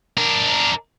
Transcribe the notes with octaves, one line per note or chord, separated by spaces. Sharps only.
D4 A#4